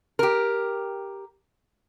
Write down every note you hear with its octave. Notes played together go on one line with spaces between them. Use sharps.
G4 A#4